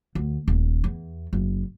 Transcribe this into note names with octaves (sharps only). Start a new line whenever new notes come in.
D2
D#1
E2
F#1